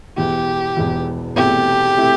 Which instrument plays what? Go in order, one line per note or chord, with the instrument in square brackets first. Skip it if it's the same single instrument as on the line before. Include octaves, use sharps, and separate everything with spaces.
[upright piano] E1 E2 E3 [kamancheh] G4
[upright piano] E1 E2 E3
[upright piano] E1 E2 C3 A3 E4 [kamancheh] G4
[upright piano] C3 A3 E4